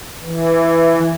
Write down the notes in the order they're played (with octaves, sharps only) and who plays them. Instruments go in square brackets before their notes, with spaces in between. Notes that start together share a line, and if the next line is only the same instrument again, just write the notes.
[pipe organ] E3